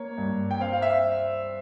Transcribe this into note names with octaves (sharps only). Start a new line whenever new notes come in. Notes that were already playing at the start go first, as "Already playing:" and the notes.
Already playing: A#3 C#5
G2
G5
C4 F5
F5
E5